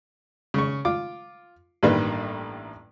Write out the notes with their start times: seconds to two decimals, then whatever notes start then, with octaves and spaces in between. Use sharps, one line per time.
0.54 C#3 C#6
0.85 F4 D6
1.83 A1 G2 D#3 G3 A#3 B4